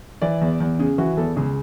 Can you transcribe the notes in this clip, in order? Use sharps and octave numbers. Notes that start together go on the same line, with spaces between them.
E3 D5
E2
E2
C#3 G#4
E3 F#4
E2 A4
C#2 G#4